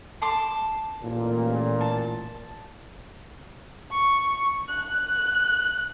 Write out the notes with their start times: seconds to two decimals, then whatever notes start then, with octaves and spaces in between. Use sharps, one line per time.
0.22 A5 C6 D6
1.03 A1 A#2
1.81 A5
3.91 C#6
4.69 F#6